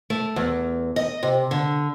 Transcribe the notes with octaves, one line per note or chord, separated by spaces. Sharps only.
A3
E2
D#5
C3
D3